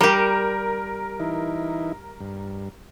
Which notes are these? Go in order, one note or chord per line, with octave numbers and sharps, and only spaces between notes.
G3 G4 A#4
E3 D#4 E4
G2